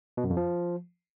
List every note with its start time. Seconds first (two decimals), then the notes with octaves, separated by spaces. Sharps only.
0.17 B2
0.24 F#2
0.30 F2
0.37 F3